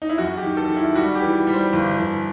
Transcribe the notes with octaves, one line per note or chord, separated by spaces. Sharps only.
D#4
E4
F#2 F#4
G4
D#3
A4
D#3
E4
G3 F#4
G4
E3
G3
C5
G1
G1